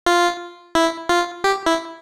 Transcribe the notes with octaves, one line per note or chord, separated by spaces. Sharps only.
F4
E4
F4
G4
E4